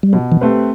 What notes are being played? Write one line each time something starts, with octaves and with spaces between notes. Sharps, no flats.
G3
B2 F#3
E3
A3 C4 G4 B4